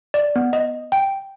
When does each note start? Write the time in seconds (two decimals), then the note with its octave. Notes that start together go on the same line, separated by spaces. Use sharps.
0.14 D5
0.36 B3
0.53 D#5
0.92 G5